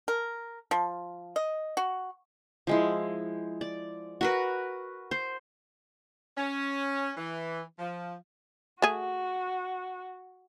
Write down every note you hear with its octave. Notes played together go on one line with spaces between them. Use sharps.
A#4
F3
D#5
F#4
F3 G#3 E4
D5
F#4 A#4 B4
C5
C#4
E3
F3
A3 F#4 G#4